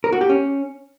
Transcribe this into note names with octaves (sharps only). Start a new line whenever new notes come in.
A#4
F#4
G4
C#4